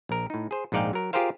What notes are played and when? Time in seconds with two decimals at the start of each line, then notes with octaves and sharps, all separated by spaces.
0.09 A#1 A#4
0.30 A2 D#4
0.51 G#4 C5
0.72 A#1 G#2 D#4 D5 F5 G5
0.93 F#3 A#4
1.13 F4 G4 G#4 A#4 C5 F5